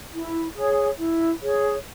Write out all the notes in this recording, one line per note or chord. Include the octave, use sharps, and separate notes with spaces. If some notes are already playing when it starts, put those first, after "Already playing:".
E4
G#4 C#5
E4
G#4 C#5